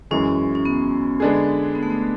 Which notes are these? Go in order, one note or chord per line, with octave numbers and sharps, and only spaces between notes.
F#2 E3 G#3 C#4
C#4
B3
D3 G#3 B3 D4 G#4
B3
A3
B3